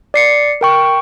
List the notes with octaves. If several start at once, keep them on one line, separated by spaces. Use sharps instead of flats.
D5 C7 C#7
A#4 G5 C#6